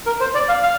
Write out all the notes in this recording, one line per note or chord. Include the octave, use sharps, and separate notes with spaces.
A#4
C5
D5
F5
F5